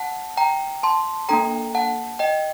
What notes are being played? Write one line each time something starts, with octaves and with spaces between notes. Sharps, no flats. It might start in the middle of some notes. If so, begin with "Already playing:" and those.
Already playing: F#5 A5
G5 A#5
A5 C6
A#3 D4 A4 G5 A#5
F#5 A5
D#5 G5